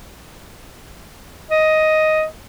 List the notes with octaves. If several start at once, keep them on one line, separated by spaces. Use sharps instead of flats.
D#5